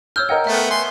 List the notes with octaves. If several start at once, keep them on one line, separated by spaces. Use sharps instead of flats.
C#5 E6 F6 G6
A#4 D#5 F#5 G5
A3 B3 E5
G#5 C6